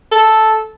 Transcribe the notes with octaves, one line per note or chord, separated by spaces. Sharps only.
A4